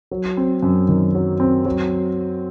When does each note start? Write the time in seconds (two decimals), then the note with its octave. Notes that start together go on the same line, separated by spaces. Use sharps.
0.11 F#3
0.37 C4
0.63 F#2
0.89 D#3
1.15 F#3
1.40 C4
1.65 F#3